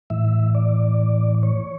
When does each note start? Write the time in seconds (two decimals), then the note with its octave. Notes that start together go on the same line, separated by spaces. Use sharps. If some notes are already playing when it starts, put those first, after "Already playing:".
0.10 A2 E3 E5
0.55 D5
1.43 C#5